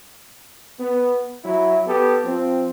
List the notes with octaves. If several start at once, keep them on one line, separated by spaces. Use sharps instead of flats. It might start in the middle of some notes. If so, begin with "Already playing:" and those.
B3
F#3 E4
B3 G4 A4
F3 C4